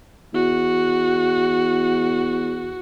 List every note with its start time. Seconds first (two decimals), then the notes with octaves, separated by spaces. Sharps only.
0.34 E2 F#4